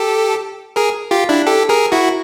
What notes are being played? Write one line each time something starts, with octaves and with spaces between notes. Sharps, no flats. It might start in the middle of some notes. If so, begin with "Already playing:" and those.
Already playing: G4 A4
G#4 A#4
F4 G4
D4 E4
G4 A4
G#4 A#4
E4 F#4